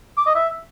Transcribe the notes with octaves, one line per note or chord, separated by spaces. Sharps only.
D6
D#5
E5